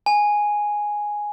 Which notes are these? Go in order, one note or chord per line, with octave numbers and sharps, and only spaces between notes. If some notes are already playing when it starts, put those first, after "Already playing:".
G#5